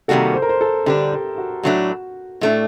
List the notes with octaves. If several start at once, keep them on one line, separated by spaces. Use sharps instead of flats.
C3 D#3 G3 A#3 F#4 A4
C5
A#4
C5
A4
D3 G3 D4 G4
G4
F#4
A2 F#3 A3 D4 F#4
A2 A3 D4